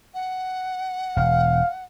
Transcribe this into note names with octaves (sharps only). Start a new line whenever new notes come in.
F#5
E1 F5